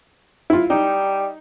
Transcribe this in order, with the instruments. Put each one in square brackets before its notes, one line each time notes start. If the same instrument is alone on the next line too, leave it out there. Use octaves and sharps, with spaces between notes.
[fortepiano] E4 F4
[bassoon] G3 [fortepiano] D#4